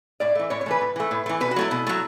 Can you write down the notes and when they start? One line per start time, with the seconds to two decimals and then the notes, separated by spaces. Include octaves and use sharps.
0.20 A2 D5
0.35 E3 A3
0.50 A2 C#5
0.61 C#5
0.66 E3 A3 B4
0.81 A2
0.96 E3 A3
1.11 A2
1.26 E3 A3
1.40 B2 B4
1.51 F#4
1.56 F#3 A3 E4
1.71 B2
1.87 F#3 A3